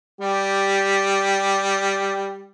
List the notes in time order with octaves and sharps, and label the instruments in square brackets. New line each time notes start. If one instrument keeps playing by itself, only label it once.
[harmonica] G3 G4